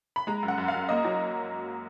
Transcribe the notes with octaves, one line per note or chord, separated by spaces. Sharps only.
B5
G#3 A#5
F#2
F#5
F#2
F5
F#2
A#3 D#5
F#3